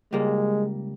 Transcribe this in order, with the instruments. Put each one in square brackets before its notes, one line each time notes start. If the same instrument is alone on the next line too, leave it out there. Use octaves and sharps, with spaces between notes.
[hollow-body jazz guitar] C#2 G3 A#3 [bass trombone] G#3